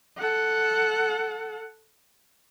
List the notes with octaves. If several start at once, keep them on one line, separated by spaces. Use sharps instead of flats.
A4 F#5